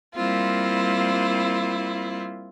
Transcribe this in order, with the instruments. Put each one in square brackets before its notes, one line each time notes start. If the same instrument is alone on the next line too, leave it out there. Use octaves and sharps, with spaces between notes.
[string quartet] G3 A#3 C4 E4 F4